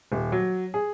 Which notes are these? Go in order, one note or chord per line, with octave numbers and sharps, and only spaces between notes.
D#1
F#3
G#4